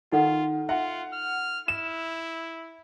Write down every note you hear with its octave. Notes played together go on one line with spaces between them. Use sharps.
D#3 D#4 F4 A4 F#5
F4 E5 F#5
F6
E4 E7